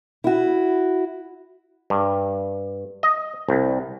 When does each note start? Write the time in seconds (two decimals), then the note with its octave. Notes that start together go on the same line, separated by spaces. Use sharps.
0.24 E4 F#4
1.90 G2
3.03 D#5
3.49 C2